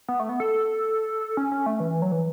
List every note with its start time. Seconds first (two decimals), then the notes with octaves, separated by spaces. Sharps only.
0.09 B3
0.20 A3
0.29 B3
0.40 A4
1.37 C#4
1.52 C#4
1.66 A3
1.80 E3
1.90 E3
2.02 F#3
2.12 E3